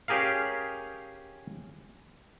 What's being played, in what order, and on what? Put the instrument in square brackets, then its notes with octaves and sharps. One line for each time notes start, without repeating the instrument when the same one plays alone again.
[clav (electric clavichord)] C#4 G4 G#4 A#4 F5